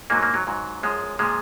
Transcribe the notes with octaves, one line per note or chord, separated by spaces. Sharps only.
G#2 F#3 A#3
A#3
F#3
G#2 F#3
F#2 F3 G#3
A#2 F3 G#3